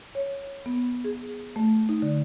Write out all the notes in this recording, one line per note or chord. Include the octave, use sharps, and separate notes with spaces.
C#5
B3
G#4
A3
D#4
D3